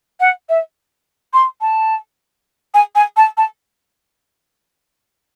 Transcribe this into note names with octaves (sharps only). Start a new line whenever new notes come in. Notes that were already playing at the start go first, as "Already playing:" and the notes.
F#5
E5
C6
A5
G#5
G#5
A5
A5